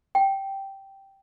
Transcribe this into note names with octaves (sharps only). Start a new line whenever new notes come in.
G5